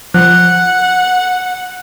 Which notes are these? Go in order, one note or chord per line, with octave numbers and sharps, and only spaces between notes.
F3 F#5 F#6